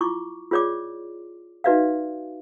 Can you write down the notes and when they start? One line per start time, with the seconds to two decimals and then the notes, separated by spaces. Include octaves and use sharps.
0.01 E4 F4 C#6 D6
0.51 F4 G#4 C#5 D5 D6
1.64 D#4 F#4 B4 D5 E5 F5